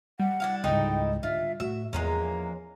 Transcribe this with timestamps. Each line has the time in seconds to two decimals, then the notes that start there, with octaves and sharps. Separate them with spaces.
0.20 G3 F#5
0.40 D4 E4 F5
0.64 C#2 G#2 D#4 E4 A4 G5
1.23 D3 F4 E5
1.60 A2 F#4 E5
1.93 E2 F3 G#3 A#3 C#4 A#5